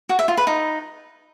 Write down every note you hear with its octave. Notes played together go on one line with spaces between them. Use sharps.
F#4
E5
F4
B4
D#4